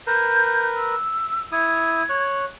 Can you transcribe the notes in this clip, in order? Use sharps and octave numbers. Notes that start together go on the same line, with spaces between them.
A#4 B4 G6
E6
E4 D#6 G#6
C#5 F#6